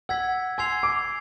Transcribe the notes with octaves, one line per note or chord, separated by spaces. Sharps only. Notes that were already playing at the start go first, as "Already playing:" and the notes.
F#5 E6 G#6 B6
G#5 C6 E6 G#6 C7 F7
D6